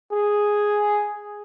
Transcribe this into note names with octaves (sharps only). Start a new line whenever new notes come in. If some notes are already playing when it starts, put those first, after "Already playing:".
G#4